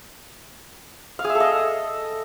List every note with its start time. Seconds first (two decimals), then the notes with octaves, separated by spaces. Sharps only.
1.19 F5
1.24 G#4
1.30 E5
1.35 A4
1.40 D#5